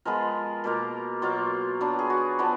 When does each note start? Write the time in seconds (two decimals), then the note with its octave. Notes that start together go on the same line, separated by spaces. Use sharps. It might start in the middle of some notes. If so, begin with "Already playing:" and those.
0.05 F3 G#3 B3 F4 A#4
0.64 B2 A#3 F4
1.22 B2 F#3 A#3 F4
1.81 F#3 B3 D4 F4
1.99 G#4
2.10 F#4
2.39 F3 B3 D4 F#4